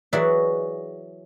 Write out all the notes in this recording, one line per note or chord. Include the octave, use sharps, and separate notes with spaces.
E3 F#3 F#4 G#4 D5 E5